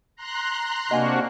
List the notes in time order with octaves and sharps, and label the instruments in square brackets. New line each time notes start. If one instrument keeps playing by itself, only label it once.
[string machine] A#5 C6 F#6
[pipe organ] C3 D4 F#4 [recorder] A#3 [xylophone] D#5 F#5 G#5